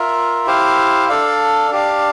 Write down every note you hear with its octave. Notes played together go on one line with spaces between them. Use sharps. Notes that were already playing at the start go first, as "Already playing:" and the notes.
Already playing: F4 A#4 E5
E4 G4 C5 F5
D4 A4 D5 F5
D4 G4 D5 F5